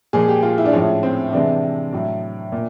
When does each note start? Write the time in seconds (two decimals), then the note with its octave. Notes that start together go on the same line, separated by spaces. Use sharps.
0.13 A#2 F3 G#3 G#4
0.28 G4
0.43 F4
0.58 E4
0.66 D4
0.73 A2 F3 G#3 C#4
1.03 C4
1.33 C3 E3 G#3 D4
1.93 A2 F#3
2.52 A#2